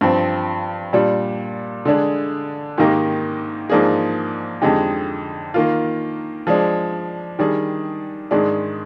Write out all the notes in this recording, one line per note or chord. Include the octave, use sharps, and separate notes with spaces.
G2 F3 C4
A#2 G3 D4
D3 G#3 D4 G#4
G#2 D#3 A#3 D#4 G4
G#2 F3 A#3 D4 G#4
F2 D3 G#3 D#4 G4
D#3 A#3 F4
F3 G#3 D4
D#3 G3 D4 G#4
G#2 D#3 G#3 D4 G#4